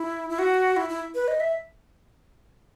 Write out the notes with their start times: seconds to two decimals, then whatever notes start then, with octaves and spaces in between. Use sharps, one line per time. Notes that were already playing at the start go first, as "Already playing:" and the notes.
Already playing: E4
0.30 E4
0.39 F#4
0.76 E4
0.89 E4
1.15 B4
1.28 D#5
1.40 E5